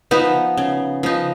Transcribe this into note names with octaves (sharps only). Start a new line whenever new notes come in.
F3 B3 D#4
C#3
F3 B3 D#4